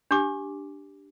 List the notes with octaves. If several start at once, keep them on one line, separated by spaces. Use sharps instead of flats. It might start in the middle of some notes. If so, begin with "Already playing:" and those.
D4 G4 D6